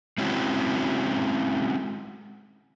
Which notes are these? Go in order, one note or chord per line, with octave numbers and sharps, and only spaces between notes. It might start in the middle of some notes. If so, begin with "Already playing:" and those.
G#3 C4 C#4 E4 F#4